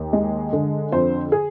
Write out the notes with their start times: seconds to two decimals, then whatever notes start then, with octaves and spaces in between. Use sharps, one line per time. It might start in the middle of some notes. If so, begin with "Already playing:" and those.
Already playing: D#2
0.13 G#3
0.53 D3
0.92 F2 C5
1.32 G#4